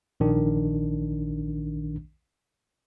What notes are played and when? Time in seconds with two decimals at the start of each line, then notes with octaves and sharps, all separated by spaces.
0.20 A#1 D#3 D4